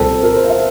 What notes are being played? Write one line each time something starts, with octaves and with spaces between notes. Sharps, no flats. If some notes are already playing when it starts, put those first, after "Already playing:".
Already playing: C2 A#2 F3 C4 A4
A#4
C5
F5
E5